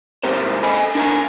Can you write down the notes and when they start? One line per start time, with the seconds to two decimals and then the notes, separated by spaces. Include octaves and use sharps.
0.23 C2 G#2 C4 G4 A#4 C5
0.63 A4 D#5 G#5 B5
0.95 D4 A#4 G#5 A#5